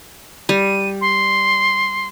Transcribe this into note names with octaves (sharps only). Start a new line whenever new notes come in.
G3 D#7
C6